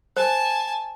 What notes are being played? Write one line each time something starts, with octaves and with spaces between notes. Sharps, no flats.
C5 G#5 A5